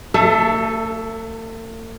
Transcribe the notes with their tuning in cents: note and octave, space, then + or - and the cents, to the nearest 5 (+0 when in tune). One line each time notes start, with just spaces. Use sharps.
A3 +45 A4 +0 E5 +30